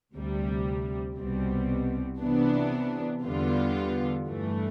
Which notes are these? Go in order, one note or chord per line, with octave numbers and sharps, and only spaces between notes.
D2 C3 G3
C2 B2 G3 C4
C3 E3 B3 D4
E2 D3 G3 B3 F4
G2 E3 A3